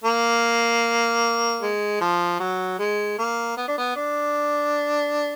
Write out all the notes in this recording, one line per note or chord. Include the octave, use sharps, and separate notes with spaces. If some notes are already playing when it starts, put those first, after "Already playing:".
A#3
G#3
F3
F#3
G#3
A#3
B3
D4
B3
D4